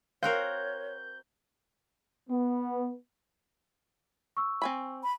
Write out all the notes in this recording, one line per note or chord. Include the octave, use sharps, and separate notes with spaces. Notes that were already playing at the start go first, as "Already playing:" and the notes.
C4 F#4 A#4 C#5 F5 G6
B3
C#6 E6
C4 G#5 B5
B5